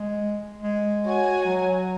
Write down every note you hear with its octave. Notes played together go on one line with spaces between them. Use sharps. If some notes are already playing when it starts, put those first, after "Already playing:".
Already playing: G#3
G#3
F#4 C#5 G#5
F#3